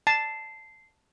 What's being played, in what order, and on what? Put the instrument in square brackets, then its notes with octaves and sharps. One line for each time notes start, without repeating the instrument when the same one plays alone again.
[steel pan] A5 [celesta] C7